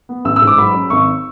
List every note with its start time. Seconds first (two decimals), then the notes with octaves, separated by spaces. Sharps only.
0.09 B3
0.25 A1 E6
0.36 E6
0.42 G#2
0.47 D6
0.58 F#3 B5
0.74 C#4
0.90 G#1 C#6